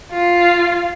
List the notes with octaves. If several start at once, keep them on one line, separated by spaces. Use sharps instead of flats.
F4